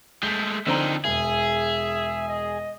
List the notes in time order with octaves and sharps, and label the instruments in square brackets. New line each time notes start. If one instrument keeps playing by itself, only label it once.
[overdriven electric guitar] G#3 A3 [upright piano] G6 B6
[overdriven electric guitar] F2 D#3 [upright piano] D3 C5 A#5
[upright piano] E1 [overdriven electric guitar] G#4 [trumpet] E5
[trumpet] D#5